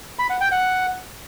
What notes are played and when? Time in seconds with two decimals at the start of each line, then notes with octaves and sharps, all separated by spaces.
0.19 B5
0.30 F#5
0.41 G5
0.51 F#5